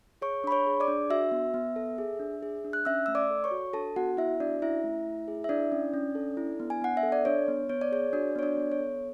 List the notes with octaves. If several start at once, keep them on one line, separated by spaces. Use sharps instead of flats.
G#4 C#5 C#6
D4 B5
C#5 C#6
G#4
D5 D6
D4
F#4 E5 E6
B3
B3
A4
G#4
D4
G#4
D4
F#6
C#4 E5 E6
A3 E6
D5 D6
A4
C#5 C#6
F#4
D4 A4 A5
B3 F#4 F#5
B3 E4 E5
D4 F#4 D5
C#4 E4 E5
A3
A3
G#4
E5
D4 E4 D5
C#4
C#4
A4
E4
B3
G#5
B3 F#5
E5
A4
D5
D4 C#5
B3
B3 C#5
D5
G#4 C#5
D4 F#4 D5
B3 C#5
D4 D5
B3
C#5
A4